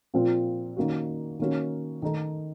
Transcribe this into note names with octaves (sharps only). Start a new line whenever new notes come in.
A#2 F3 C4 F4
D#3 A#3 C#4 F#4
D#3 A#3 C#4 F#4
D#3 A3 D#4 A4